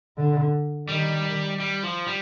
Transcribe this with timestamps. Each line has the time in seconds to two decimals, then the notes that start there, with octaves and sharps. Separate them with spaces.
0.17 D3
0.88 D#3 G3
1.60 G3
1.83 F3
2.07 G3